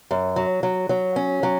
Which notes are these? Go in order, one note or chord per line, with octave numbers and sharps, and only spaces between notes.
F#2
F#3
F#3
F#3
C#4
F#3